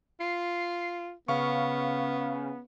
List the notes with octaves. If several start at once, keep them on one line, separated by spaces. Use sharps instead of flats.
F4 C7
C#3 B3 F5 C#6